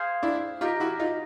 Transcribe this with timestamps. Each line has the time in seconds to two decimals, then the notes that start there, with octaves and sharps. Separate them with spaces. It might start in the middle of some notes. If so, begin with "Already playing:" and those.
Already playing: G#4 C5 F5 G#5
0.23 D4 E4
0.61 D#4 F4 G4 A#4 D#5
0.80 E4 F#4
1.00 D#4 F4